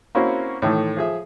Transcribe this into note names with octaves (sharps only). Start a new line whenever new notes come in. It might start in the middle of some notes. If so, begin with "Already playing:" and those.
A#3 C4 C#4 E4 F#4
A2 D#3 E3 A4
F3 G#4 E5